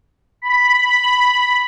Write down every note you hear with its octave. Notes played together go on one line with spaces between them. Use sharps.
B5